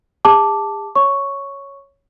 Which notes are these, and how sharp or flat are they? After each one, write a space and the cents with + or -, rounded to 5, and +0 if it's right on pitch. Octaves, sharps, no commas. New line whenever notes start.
G#4 -45 A5 +0 D6 +0
C#5 +0 C#6 +0